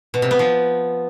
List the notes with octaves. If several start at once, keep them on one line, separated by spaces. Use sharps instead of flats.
B2
C3
B3
F3